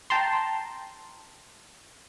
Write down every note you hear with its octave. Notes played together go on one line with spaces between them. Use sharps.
G5 A5 A#5 C6